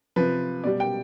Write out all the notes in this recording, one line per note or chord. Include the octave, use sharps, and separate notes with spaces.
C3 F3 B4
B2 G3 D5
G5